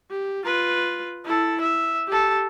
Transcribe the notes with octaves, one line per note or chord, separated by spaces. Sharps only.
G4
F4 B4
E4 A4
E5
G4 A4